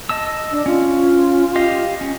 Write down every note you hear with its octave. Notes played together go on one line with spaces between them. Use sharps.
D#5 A5 E6
D4
C#4 F4
G4 D#5 F5
C#4